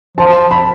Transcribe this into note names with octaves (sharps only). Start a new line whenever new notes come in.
F3 A5
B5